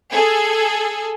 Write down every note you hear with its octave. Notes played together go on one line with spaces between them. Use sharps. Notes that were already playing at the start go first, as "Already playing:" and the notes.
G#4 A4